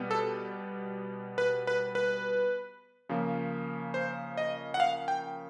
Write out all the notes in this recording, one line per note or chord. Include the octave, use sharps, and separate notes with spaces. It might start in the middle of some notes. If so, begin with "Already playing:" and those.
Already playing: B2 G3 B3
A4
B4
B4
B4
C#3 F3 A#3
C5
D#5
F#5
F5
G5